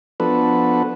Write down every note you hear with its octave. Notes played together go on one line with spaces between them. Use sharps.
F3 B3 D4 F#4 A4 B4